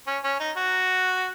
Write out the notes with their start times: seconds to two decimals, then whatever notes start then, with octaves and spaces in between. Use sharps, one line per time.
0.07 C#4
0.24 C#4
0.40 D#4
0.57 F#4